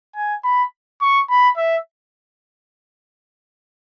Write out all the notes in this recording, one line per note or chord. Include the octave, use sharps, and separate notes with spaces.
G#5
B5
C#6
B5
E5